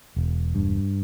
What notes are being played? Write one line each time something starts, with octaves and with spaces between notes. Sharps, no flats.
E1
G2